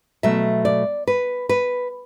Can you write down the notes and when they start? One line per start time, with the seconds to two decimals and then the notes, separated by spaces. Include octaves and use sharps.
0.23 B2 F#3 A3 E5
0.65 D5
1.07 B4
1.49 B4